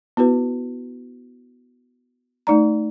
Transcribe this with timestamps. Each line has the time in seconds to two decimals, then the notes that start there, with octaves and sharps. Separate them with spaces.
0.17 B3 E4 F#4 B4
2.47 A3 D#4 D5 A#5